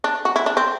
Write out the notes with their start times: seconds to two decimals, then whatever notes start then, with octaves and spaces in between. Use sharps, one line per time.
0.04 D4
0.25 F#4
0.36 E4
0.46 D4
0.57 C4